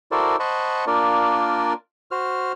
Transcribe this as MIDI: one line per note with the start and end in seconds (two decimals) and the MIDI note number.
0.12 0.36 64
0.12 0.36 66
0.12 0.36 69
0.12 0.36 70
0.12 0.36 72
0.12 0.36 74
0.40 0.85 72
0.40 0.85 75
0.40 0.85 78
0.40 0.85 81
0.40 0.85 83
0.40 0.85 85
0.87 1.73 58
0.87 1.73 62
0.87 1.73 65
0.87 1.73 70
0.87 1.73 74
2.11 2.52 66
2.11 2.52 72
2.11 2.52 89